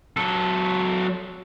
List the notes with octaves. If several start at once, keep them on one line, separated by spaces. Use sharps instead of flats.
F#3 A4